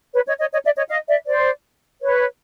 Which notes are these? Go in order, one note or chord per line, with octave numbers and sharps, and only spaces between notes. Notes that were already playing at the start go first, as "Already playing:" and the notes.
B4 C#5
C#5 D#5
C#5 D#5
C#5 D#5
D5 E5
C#5 D#5
D#5 F5
D5 E5
C5 D5
B4 C#5